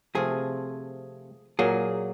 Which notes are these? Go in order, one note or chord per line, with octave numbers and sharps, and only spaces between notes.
C3 F3 A3 C4 F4 G#4
A#2 F#3 A#3 G#4